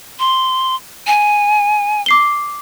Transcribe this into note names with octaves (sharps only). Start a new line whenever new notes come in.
C6
G#5
D6 C7 G7